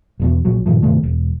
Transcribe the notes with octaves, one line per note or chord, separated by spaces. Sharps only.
E1 E2 B2
A#1 F#3
G2 A#2 D#3 F3
G2 C3 D#3 A3
E1